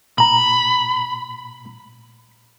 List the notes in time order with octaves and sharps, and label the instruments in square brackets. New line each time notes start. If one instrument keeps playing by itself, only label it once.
[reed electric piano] A#2 A#5 [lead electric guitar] B5